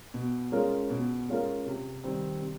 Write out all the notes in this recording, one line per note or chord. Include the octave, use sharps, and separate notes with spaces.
B2
G#3 C#4 F4 A#4
B2
G#3 C#4 F4 A#4
C3
D#3 G3 C4
C3